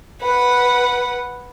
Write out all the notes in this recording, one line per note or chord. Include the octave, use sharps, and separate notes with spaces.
B4 F#5